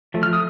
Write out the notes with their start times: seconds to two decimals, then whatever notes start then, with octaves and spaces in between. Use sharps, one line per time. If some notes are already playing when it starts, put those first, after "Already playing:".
0.14 F3 A3
0.23 F6
0.33 D#6